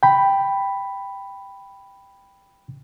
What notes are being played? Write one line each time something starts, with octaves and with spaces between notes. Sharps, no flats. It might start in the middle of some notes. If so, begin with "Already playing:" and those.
G5 B5